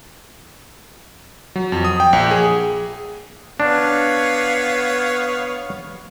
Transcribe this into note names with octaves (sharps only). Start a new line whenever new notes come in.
F#3
F2
D#6
G5
A#1
G#4
B3 D4 C#5 F5